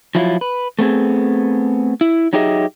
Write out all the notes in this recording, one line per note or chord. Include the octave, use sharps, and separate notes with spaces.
F3 F#3 E4 F4
B4
A3 B3 C4 G#4
E4
F#3 D#4 G4 G#4 D#5 E5